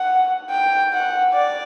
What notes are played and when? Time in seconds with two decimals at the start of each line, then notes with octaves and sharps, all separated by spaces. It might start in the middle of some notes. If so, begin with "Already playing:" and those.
Already playing: F#5
0.50 G5
0.93 F#5
1.34 D5